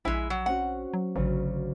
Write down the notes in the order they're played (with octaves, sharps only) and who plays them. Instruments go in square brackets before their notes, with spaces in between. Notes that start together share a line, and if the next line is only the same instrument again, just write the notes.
[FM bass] A#1 [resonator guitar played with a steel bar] G#3 E4 [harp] G#5 B5
[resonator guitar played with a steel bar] F#3
[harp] C4 C#4 F#4 [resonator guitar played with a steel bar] F#5
[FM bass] F#3
[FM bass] A1 [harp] D2 C#3 F#3